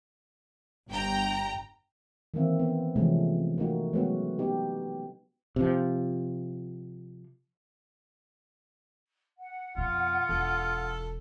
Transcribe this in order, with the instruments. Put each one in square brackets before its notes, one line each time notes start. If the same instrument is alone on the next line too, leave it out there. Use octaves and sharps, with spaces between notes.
[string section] G1 G5 A#5
[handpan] D#3 E3 A#3 C4 E5
B3
C3 E3 F3 G#3 A3 C#4
A3 A#3 D#4 F#4
F#3 G#3 A3 B3 C#4 F#4
B3 D#4 G4
[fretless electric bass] C3 F3
[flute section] F#5
[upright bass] F2 B2 [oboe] F4
[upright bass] E1 [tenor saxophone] A4